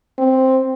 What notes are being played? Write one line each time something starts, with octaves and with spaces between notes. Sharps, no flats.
C4